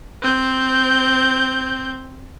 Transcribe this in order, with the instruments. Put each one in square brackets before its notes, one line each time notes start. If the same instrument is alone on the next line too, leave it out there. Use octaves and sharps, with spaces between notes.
[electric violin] C4 G6